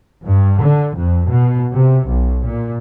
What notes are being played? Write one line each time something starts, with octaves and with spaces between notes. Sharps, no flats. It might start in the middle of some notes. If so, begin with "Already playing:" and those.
G2
D3
F2
B2
C3
B1
A#2